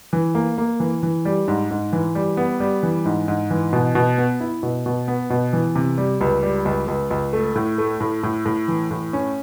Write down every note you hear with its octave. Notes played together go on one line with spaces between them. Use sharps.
E3
A#3
A#3
E3
E3
G3
G#2
G#2
E3
G3
B3
G3
E3
G#2
G#2
E3
B2
B2
B3
E4
B2
B2
B3
B2
E3
C3
G3
C#2
G3
C#2
C#2
C#2
A3
A2
A3
A2
A2
A2
E3
A2
C#4